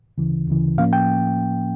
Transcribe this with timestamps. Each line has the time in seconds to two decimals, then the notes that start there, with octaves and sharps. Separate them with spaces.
0.18 D2 C#3 E3
0.48 D2 C#3 E3
0.78 A2 F3 A#3 C#4 F5
0.93 G5